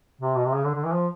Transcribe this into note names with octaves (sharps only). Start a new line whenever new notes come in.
C3
B2
C3
C#3
D3
D3
E3
F3